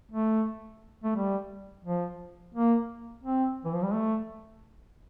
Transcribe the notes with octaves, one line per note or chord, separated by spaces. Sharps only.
A3
A3
G3
F3
A#3
C4
E3
F3
G3
A3